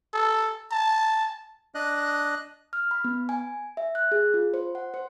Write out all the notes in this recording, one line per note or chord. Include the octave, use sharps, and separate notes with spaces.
A4
A5
D4 D#5 F#6
F6
B5
B3
G#5
E5
F#6
G#4
F4
C5
F#5
C5